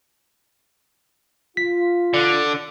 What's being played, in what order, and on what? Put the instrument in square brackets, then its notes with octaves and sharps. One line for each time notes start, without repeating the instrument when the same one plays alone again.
[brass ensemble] F4 [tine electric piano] B6
[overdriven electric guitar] D3